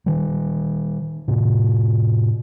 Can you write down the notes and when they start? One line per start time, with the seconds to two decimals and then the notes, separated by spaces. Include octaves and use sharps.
0.06 D#3 G3
1.28 A2 C3